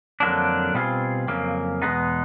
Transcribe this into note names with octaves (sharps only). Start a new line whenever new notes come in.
F2 D3 F#3 A#3 D4
B2 G3 C4 F4 G#4
F2 C#3 F#3 A#3
E2 B2 G#3 B3 D#4